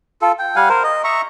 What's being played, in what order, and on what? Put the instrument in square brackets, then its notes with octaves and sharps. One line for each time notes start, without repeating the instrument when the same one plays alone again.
[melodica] F4 A4
G5
G3 F5 F#5 G#5
A#4 C5
D#5
E5 A#5 C#6